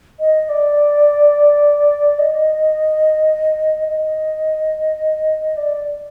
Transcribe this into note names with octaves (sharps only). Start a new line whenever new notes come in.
D#5
D5
D#5
D#5
D5